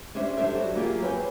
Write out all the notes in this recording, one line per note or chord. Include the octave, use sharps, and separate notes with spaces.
C#4 D4 G4 C5 E5
F#3 D4 G4 A4 C5 E5
G3 F#4 D5
F#3 A#3 F4 G4 G#4
C4 B4 C#5 G5 G#5